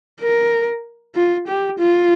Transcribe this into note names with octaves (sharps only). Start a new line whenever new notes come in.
A#4
F4
G4
F4